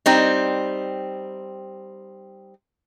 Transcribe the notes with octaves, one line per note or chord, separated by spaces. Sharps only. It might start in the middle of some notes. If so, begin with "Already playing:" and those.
G3 C4 D#4